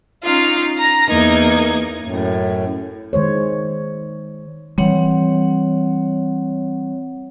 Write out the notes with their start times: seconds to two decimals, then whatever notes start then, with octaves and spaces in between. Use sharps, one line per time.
0.23 C#4 D#4 F4 F5
0.77 A#5 A#6
1.08 E2 A#3 D#4 G#6
2.01 F#2 A2
3.13 D#3 G#3 C5 C#5
4.78 E3 G3 C4 C#5 F#5